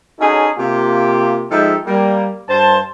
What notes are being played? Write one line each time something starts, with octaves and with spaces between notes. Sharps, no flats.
C#4 D#4 F#4 G#4 A4 C#5
C3 A#3 F4 G4
F3 G#3 D#4 A4 E5 G5
G3 A#3
G2 C5 A5